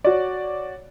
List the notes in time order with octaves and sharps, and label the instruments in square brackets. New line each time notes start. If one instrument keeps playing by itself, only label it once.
[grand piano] F#4 C#5 D5